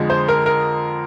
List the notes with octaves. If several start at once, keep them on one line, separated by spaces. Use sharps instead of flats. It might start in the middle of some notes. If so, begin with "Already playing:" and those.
Already playing: F2 D3 G#3
C5
A#4
A#4